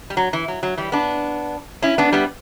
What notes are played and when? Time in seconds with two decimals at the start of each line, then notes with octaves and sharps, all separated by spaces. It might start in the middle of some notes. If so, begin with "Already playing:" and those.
0.10 G3
0.17 F#3
0.33 E3
0.48 F#3
0.63 F#3
0.77 E3 G3
0.92 B3 D4
1.82 C#4 E4
1.98 B3 D4
2.12 G3 B3